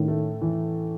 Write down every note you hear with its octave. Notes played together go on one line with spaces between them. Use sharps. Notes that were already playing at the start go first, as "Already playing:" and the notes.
Already playing: A2 D#3 C#4
A3
E3